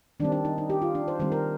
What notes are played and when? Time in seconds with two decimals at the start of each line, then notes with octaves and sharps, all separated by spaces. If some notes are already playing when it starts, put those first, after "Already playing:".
0.20 D#3 G3 C4 D4
0.32 D4
0.45 D#4
0.58 D#4
0.70 G4
0.82 F4
0.95 D4
1.08 C5
1.20 D#3 G3 C4 C5
1.32 A#4